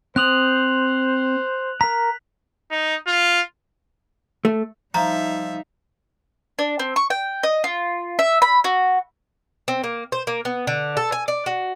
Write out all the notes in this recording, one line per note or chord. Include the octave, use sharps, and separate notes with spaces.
C4 C5 D#6 F#6 F7 F#7
A#4 A#5 B6
D#4
F4
A3
F3 G3 D#4 E5 A#5
D4
C4
C#6
G5
D#5
F4
E5
B5
F#4
C4
A#3
C5
A#3
B3
D3
A4
G#5
D5
F#4